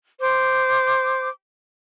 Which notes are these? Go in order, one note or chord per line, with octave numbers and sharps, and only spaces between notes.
C5 D6